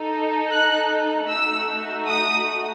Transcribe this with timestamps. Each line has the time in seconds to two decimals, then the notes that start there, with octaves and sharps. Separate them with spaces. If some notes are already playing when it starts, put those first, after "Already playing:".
Already playing: D#4 A4
0.51 F#6
1.28 A3 D#4 F#4 E6
2.07 D#6